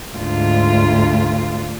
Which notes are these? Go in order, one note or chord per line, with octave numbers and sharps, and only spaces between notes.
D2 G#2 F4